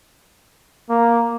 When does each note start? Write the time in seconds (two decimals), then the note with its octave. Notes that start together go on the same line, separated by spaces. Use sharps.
0.90 A#3